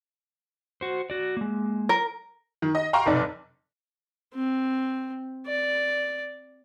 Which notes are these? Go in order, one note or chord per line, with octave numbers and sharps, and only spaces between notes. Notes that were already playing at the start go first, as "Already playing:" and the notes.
F#4 C5
F#4 D5
G#3 A#3
A#4
D#3
D#5
F5 G5 A#5 C6 C#6
F1 B1 D#4 D5
C4
D5